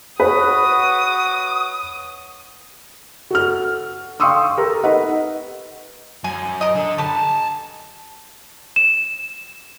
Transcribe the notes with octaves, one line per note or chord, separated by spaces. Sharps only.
F#4 B4 C#5 D#6
F#4 A4 F6
F5 G5 C6 C#6 D#6 E6
G4 A4 A#4
D#4 B4 D#5 F#5
F#2 G#5
A#4 D#5
D3
G4 A4 B4 G#5 A5
E7